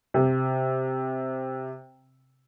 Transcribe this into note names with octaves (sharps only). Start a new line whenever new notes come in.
C3